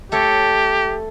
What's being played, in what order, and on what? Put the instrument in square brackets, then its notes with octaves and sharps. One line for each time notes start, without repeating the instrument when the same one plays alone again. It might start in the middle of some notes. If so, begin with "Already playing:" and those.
[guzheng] A3 A4 C#5 [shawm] G4